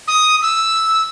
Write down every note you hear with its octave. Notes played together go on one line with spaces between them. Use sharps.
D#6
E6